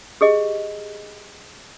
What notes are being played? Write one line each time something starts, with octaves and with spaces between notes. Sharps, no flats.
G4 G#4 D#5